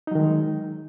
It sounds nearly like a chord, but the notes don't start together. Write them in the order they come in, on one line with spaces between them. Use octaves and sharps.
D#4 F#3 D#3 G#3